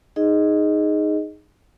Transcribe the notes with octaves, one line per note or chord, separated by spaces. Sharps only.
D#4 G#4 D#5